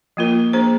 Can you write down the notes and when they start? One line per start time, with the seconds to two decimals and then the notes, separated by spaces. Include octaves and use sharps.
0.17 F3 A#3 F4 A#4
0.53 A#3 D4 G#4 C5